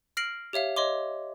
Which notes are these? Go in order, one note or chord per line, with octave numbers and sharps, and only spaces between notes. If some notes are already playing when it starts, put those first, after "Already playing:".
F6 A#6 C7 D7 F#7
G4 C#5 E5 F5
C#5 D#5 C6 D6